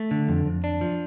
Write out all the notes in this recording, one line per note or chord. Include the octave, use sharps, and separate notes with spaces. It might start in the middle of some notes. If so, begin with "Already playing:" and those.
Already playing: A3
D3
F2
F2
D4
F3